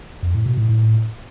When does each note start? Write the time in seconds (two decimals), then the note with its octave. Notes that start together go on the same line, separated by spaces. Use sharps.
0.23 F2
0.34 A2
0.46 B2
0.57 A2
0.69 A2